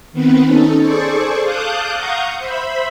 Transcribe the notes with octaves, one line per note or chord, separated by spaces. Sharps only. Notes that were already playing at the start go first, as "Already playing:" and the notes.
D#3 B3 C4 B4
C#4 D#4 A4
G#4 A4 C5 D5 C#6
F5 A5 D6 D#6 F#6 G6
F5 F#5 A#5 C#6 D#6 G6
C5 E5 B5